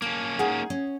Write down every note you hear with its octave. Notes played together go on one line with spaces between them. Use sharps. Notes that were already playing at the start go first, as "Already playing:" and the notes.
A#3 C#4 A5
G#3 D#4 G#4 F#5
C#4